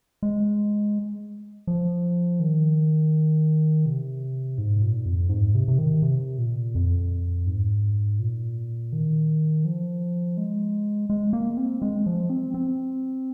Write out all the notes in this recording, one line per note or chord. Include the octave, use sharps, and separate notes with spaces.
G#3
F3
D#3
C3
G#2
A#2
F2
G#2
C3
C3
D#3
C3
A#2
F2
G#2
A#2
D#3
F3
G#3
G#3
A#3
C4
G#3
F3
C4
C4